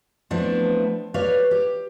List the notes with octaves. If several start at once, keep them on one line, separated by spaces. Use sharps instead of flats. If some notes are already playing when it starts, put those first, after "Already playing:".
F3 A3 B3 C4 D4 E4
G4 B4 C#5 D5 F5
G4